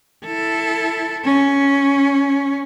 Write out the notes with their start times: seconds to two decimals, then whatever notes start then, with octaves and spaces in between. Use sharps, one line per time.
0.25 E4 A4
1.24 C#4